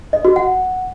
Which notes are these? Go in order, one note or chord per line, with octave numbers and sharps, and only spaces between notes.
D#5
F#4
F#5